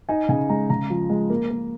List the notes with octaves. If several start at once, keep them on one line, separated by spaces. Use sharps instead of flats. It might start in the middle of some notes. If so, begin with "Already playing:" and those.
D#4 G#5
C#3 G#5
G#3 A#5
C#3 A#5
F3
G#3
A#3
A#3